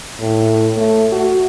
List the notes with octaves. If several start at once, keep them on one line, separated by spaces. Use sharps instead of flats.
A2
A3
F#4